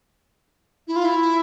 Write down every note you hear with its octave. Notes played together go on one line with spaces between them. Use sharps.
E4
F4
E4